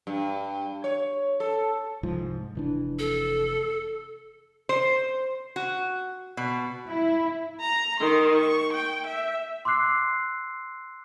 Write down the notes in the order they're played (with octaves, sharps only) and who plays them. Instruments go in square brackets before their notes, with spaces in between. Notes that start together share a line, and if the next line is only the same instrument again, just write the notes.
[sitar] G2
C#5
A4
[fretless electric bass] C2 G#2 F3
F1 E3 D4
[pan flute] A4
[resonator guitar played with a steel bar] C5
F#4
B2
[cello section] E4
[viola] A#5
D#3 C6
C#6
G5
E5
[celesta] C6 D6 E6 F#6 C7